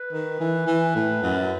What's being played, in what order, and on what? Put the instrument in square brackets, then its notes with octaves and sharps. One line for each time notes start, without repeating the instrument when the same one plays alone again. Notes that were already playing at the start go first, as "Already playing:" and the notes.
Already playing: [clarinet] B4
[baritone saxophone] D#3
E3
E3
A2
F#2